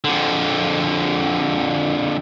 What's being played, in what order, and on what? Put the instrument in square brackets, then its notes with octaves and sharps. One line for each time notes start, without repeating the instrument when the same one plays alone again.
[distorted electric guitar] F2 D3